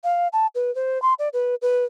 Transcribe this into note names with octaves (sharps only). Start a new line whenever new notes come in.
F5
A5
B4
C5
C6
D5
B4
B4